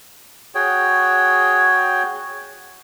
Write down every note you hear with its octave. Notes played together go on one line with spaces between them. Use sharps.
F#4 G#4 C#5 G5